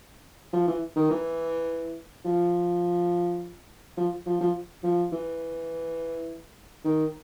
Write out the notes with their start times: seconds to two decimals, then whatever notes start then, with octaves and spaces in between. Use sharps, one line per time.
0.53 F3
0.67 E3
0.96 D#3
1.11 E3
2.25 F3
3.97 F3
4.26 F3
4.41 F3
4.83 F3
5.12 E3
6.84 D#3